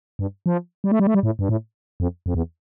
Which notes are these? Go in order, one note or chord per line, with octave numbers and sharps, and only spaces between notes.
G2
F3
G3
A3
G3
A3
G3
A2
G2
A2
F2
F2
E2